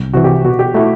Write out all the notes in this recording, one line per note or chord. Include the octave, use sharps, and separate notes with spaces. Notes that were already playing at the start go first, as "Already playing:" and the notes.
Already playing: C2
C3 E3 F#4
G4
B2 F#4
G4
A3 E4 F#4